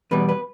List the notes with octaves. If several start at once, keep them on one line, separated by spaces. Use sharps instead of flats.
E2 B2 G3 B4
B4